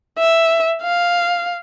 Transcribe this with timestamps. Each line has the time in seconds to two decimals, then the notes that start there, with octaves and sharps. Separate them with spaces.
0.19 E5
0.83 F5